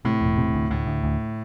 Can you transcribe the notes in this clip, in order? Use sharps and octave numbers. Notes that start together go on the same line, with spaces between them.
A2 C3
E1
C3
D2
D2 A2
D2
D2